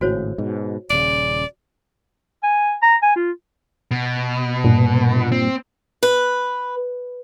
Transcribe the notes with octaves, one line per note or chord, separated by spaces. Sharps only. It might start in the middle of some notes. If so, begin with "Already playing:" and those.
G#1 A2 C#3 F#4 C5 C#5
G#2 B2
D#1 C#3 D5
G#5
A#5
G#5
F4
B2
G2 A#2
C4
B4